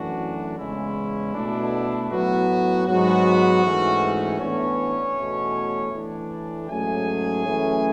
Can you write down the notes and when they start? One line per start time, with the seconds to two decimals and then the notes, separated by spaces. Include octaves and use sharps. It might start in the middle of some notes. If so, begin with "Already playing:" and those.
Already playing: F#2 E3 A3 D4 F#4
0.57 E2 C#3 G#3 C#4 E4
1.34 B2 A3 D4
2.11 A2 F#3 B3 F#4
2.87 G#2 F#3 B3 F#4
3.63 G#2 E3 A3 C#4
4.39 A2 E3 B3 C#4 D4 C#5
5.16 E2 B2 A3
5.92 A2 E3 A3 D4
6.69 G#2 F#3 A3 C#4 G#4 G#5
7.46 F#2 E3 A3 C#4